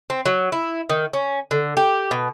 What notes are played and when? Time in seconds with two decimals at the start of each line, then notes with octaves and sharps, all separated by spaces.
0.10 C4
0.26 F#3
0.52 E4
0.90 D#3
1.13 C#4
1.51 D3
1.77 G4
2.11 B2